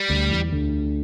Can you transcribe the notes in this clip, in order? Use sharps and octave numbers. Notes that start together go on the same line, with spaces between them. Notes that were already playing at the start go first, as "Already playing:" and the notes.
Already playing: G3
D2 D3
E2 E3
D2 D3